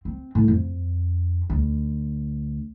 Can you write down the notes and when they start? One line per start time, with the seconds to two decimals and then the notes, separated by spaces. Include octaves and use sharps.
0.05 C4
0.35 A2
0.48 F2
1.50 D2